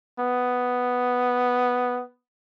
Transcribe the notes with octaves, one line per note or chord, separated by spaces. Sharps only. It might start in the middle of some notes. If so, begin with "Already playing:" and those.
B3